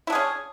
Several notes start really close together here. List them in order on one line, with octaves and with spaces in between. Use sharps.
E4 D4 G#4 C#4